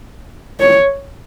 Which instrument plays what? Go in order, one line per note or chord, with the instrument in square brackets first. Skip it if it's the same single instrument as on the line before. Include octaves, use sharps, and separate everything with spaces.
[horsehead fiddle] C#5